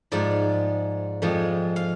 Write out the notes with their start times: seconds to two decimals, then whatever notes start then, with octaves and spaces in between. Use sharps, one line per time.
0.12 G#2 F3 G#3 D5
1.22 F2 F3 G#3
1.76 F5